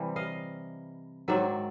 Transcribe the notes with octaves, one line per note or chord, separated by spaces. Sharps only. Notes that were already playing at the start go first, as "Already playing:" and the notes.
Already playing: C3 E3 G3
D#5 F5
G#2 D#3 F#3 D5 E5